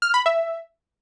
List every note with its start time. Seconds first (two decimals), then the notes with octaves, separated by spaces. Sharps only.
0.02 F6
0.14 B5
0.26 E5